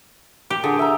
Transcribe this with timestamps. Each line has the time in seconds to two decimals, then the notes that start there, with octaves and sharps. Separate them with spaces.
0.50 G4
0.64 D3 G#4
0.79 E5 A#5